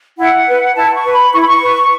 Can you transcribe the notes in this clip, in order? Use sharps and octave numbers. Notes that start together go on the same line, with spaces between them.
E4 F#5
B4
E4 A5
C#6
B4
B5
E4 C#6
B5
C#6
B4